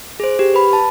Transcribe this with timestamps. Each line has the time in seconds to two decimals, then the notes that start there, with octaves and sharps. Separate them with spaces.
0.20 G#4 C5
0.39 G4
0.54 B4 B5
0.73 A5